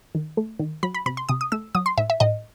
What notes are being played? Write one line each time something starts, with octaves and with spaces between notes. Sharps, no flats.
D#3
A3
D#3
F#3 B5
B5
C3 B5
C6
C3 D#6
D#6
A3 E6
F#3 D#6
C6
A2 E5
E5
A2 D#5